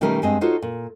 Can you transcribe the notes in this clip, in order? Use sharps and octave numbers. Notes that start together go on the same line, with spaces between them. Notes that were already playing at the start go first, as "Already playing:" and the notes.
B2 D#3 G3 A3 C#4 A#4
G2 G#3 C4 D#5
D#4 F4 F#4 A4 C5 C#5
A#2